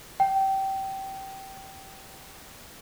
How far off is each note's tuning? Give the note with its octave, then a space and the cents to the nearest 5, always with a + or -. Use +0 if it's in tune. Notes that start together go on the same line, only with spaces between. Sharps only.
G5 -20